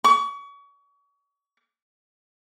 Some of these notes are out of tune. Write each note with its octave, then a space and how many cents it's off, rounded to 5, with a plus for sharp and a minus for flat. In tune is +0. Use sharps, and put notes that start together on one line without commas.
C#6 +35